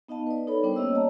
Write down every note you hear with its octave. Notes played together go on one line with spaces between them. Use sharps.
B3 D#4 D#5 F5 A5
B4 D5
D#4 A4 C#5 B5
G3 B3 D4 A#4 C5 G5
A#3 C#4 G4 C#5 D#5 E6
C#5 D5 A5 A#5